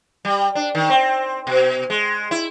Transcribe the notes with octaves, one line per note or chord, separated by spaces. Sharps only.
G3
D4
D#3
C4
B2
G#3
E4